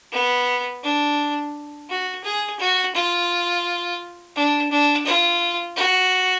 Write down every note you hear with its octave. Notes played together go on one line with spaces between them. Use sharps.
B3
D4
F#4
G#4
F#4
F4
D4
D4
F4
F#4